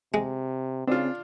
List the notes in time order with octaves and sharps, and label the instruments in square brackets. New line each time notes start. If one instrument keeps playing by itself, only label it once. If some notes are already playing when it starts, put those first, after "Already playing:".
[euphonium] C3 [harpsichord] G#3
[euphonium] C#3 [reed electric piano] C4 [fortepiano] D4 F4